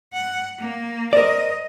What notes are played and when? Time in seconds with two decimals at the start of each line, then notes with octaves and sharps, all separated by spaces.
0.13 F#5
0.59 A#3
1.13 A#4 C5 D5 D#5